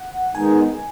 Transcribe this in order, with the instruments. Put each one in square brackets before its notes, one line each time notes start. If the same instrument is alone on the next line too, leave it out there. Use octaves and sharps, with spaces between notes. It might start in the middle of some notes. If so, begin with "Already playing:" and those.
Already playing: [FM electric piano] F#5
[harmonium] D#3 G#3 B3 D#4 [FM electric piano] G#5